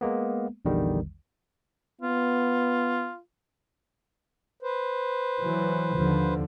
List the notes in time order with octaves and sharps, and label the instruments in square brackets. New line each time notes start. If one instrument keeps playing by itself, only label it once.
[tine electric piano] G#3 A#3 B3
A#1 E2 D3 D#3 G3
[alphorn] B3 [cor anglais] F4
[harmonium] B4 C5
[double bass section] E3 F#3
D#2 D3 F3